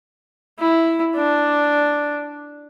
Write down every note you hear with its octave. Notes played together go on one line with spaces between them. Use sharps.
E4
D4